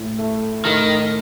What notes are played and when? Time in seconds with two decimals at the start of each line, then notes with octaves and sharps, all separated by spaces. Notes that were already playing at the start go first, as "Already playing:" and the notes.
Already playing: A2
0.19 A3
0.65 A2 D#3